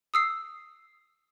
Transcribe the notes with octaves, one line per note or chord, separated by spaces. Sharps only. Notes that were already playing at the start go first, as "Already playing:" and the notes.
D#6 E6 C7